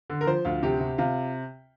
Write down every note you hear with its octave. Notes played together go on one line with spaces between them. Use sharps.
D3
A#4
F3 C5
D2 F4
C3 G4
C3
C3 F4